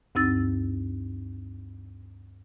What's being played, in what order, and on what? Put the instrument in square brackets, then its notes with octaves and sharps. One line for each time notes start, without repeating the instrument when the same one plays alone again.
[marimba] D2 G2 C4 D#4 E6 A6